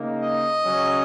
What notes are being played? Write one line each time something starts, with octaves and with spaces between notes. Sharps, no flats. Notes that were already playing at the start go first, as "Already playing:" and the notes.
Already playing: C#3 A#3 D#4
D#5
C#3 F#3 C#4